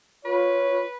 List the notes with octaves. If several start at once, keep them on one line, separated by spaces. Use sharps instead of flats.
F4 B4 C#5